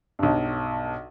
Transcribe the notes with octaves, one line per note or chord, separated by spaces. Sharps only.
B1 G2